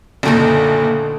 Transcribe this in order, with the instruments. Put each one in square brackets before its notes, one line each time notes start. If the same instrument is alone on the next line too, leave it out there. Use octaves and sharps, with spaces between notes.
[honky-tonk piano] F#1 A#2 [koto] D3 A3 D#4